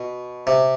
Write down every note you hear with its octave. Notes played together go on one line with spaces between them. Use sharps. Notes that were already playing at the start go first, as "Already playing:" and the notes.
Already playing: B2
C3